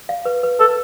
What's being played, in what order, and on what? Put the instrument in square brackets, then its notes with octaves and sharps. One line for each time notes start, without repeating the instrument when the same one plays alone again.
[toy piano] F5
B4
B4
[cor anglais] A4 [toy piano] B4